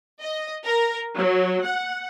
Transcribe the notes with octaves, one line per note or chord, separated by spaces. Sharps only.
D#5
A#4
F#3
F#5